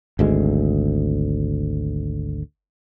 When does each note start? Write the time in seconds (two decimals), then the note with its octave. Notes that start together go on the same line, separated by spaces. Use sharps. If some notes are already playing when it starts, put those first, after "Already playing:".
0.19 G#1 D2 G#3